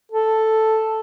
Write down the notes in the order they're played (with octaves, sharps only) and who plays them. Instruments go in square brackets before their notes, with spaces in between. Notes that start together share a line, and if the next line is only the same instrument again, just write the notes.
[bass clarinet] A4